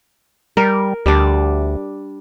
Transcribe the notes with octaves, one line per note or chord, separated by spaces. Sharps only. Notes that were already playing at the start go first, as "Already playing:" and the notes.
G3 A#4
D2 G3 D4